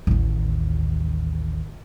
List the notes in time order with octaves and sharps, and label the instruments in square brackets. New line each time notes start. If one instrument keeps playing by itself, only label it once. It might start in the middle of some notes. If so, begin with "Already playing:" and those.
[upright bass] A1 D#2